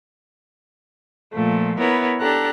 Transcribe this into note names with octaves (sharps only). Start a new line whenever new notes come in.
A#2 F3 A3
B3 E4 A#4 B4 C#5
D4 G4 A4 A#5 F#6